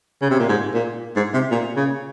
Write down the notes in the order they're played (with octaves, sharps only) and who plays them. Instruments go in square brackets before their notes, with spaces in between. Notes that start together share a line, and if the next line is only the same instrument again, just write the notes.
[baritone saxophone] C#3
C3
A#2
G#2
A#2
G#2
C3
A#2
C#3